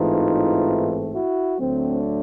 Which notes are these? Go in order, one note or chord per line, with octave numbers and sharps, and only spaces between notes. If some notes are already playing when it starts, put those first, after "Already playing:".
Already playing: A1 G#2 E3 A3 C4 D#4 F4
E4 F#4
D2 D3 F#3 A3 C4